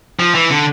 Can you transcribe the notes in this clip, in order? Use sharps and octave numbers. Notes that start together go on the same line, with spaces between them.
F3
E3
D3